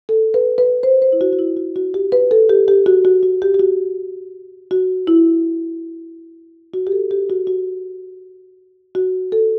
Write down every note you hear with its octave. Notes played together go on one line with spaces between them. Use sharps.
A4
B4
B4
C5
C5
E4
F#4
F#4
E4
F#4
F#4
G4
B4
A4
G4
G4
F#4
F#4
F#4
G4
G4
F#4
F#4
E4
F#4
G4
A4
G4
F#4
F#4
F#4
A4